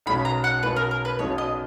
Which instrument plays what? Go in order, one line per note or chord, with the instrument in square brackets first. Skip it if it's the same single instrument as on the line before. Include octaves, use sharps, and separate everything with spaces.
[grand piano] B1 B2 G#3 C#4 [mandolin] B5
[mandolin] A#5
F#5
[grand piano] B1 B2 G#3 C#4 [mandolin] B4
[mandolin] A#4
A#4
B4
[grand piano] B1 B2 G#3 C#4 [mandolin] C#5
[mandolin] D#5